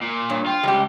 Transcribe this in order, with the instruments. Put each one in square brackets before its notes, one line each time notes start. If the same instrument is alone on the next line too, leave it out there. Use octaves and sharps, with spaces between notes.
[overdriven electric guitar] A#2
[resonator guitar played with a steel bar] G2 [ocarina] C#5
[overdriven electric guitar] F4 [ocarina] G5
[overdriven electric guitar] C#2 [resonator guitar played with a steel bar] G3 G4